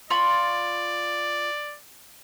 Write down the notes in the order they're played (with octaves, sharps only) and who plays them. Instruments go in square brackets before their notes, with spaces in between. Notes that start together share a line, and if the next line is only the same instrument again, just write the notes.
[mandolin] F4 B5 C#6 [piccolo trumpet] D5